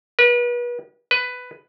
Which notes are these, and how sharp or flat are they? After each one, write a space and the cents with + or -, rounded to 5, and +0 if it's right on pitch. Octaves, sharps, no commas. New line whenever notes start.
B4 -35
B4 +10